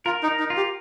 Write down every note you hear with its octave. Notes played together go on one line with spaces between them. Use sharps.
F4 A#4
D#4
A#4
D#4
F4
G4